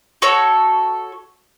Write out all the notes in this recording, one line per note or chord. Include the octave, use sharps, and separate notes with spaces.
F#4 A4 C#5